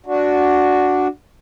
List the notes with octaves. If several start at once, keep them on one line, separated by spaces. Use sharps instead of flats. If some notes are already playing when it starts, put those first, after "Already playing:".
D4 F#4